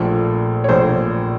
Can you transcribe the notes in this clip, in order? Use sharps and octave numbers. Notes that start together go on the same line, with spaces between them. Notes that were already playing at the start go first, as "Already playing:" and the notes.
Already playing: A#1 A#2 A3 A4
C#5
A#1 A#2 A3 C5